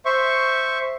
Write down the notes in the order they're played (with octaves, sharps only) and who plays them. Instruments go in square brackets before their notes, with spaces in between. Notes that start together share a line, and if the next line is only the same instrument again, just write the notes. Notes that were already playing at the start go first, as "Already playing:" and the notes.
[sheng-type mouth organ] C5 E5 C#6